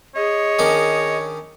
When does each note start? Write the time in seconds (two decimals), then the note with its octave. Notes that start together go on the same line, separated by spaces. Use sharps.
0.15 G#4 C#5 D#5
0.59 D#3 C#4 D4